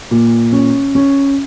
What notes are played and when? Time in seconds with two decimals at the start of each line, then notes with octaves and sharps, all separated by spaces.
0.11 A#2
0.53 C#4
0.95 C#4